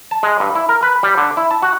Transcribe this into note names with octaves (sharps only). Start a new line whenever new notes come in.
A5
G#3
G2
E4
A#4
B4
G3
D3
E4
A5
F#4